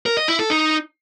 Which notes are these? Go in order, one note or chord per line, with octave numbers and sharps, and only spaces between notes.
A#4
D#5
E4
A4
D#4